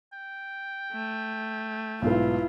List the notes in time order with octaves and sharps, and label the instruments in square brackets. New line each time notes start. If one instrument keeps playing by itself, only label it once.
[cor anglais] G5
[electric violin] A3
[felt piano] B1 G#2 B4 [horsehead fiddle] E4 F4